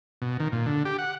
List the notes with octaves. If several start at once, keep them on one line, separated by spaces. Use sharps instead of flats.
B2
D#3
A#2
D3
G4
F#5